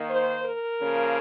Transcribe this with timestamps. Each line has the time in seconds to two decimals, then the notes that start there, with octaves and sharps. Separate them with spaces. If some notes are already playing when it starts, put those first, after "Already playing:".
Already playing: D#3 A#3
0.10 C5
0.45 A#4
0.80 C#3 F3 A#3